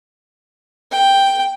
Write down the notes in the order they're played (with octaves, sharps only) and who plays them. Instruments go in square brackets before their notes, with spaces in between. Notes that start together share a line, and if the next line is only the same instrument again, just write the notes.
[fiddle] G5